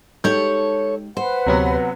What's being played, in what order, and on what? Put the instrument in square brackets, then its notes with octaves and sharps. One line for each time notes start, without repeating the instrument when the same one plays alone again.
[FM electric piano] G#3 D#4 G4 [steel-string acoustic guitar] A4 C#5 [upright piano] G6
[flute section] B4 F#5 [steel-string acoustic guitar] C5
[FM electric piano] D2 G4 C#5 [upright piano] C3 F#3 B3